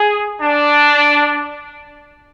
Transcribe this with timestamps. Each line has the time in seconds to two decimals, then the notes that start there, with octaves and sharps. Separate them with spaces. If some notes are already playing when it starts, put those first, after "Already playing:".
Already playing: G#4
0.41 D4